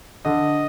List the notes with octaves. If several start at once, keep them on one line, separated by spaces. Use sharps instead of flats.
D3 D#5